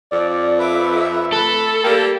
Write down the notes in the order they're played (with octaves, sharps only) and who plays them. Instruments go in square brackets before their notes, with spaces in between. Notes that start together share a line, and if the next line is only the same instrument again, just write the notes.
[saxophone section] F2 [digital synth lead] D5
[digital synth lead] B4 [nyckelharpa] E5 D6
[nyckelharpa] E5
[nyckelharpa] A3 B5 [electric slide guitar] A4
[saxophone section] G3 A#3 [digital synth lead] G5